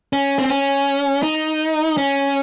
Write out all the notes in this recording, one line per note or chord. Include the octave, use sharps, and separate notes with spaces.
C#4
C4
C#4
D#4
C#4